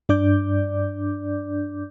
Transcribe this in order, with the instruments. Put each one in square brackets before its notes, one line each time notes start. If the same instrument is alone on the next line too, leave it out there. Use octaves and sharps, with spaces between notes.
[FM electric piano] G2 D4 D5 D6 G6